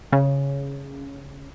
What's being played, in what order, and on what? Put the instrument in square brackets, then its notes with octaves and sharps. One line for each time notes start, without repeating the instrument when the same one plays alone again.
[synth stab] C#3